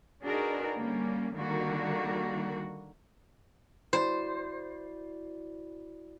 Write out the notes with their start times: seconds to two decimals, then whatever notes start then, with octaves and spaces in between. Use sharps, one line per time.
0.24 D4 D#4 F#4 G#4 A#4 B4
0.76 D3 G3 A#3 C#4
1.36 D3 D#3 G3 A#3 F#4
3.93 E4 F#4 C5 D5